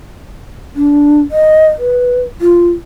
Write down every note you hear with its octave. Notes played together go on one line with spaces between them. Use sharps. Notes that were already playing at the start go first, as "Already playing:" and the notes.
D4
D#5
B4
F4